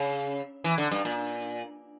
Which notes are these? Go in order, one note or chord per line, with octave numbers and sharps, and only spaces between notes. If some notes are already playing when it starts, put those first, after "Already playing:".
Already playing: C#3
E3
D3
G2
A#2